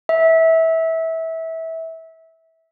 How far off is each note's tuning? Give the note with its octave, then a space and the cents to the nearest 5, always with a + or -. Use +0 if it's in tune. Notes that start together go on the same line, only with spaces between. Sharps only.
E5 -20